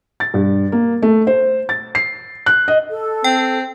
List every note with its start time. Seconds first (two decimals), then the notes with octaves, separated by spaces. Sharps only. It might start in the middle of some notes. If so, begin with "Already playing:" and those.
0.20 A6
0.34 G2
0.72 A#3
1.02 A3
1.27 C5
1.69 A6
1.95 C7
2.46 F#6
2.68 D#5
2.91 A4
3.24 C4 G5